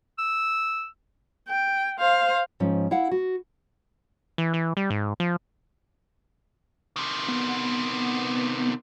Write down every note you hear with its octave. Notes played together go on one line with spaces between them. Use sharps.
E6
G5
C5 F5
G#2 F3 C#4
E4 F5 F#5
F#4
E3
E3
G3
G#2
F3
C3 D#3
B3